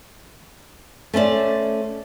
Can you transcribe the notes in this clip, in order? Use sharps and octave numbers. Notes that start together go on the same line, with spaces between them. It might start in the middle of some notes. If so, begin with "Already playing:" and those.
A3 C#4 C5 D5